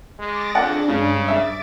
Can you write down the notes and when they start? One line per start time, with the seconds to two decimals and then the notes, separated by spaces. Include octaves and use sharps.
0.19 G#3 D6 A6 A#6
0.55 F2 D4 G#4 F#5
0.88 G2 C#3 G#3
1.28 E5 D6 A6